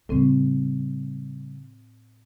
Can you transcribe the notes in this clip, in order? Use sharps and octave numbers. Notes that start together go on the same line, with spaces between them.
A2 C#3 G3 C4